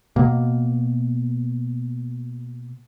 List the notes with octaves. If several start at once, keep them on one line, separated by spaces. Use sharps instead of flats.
B2 A#3